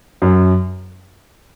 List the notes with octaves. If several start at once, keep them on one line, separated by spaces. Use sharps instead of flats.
F#2